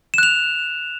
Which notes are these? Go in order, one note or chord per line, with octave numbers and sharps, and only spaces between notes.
F#6 E7 F7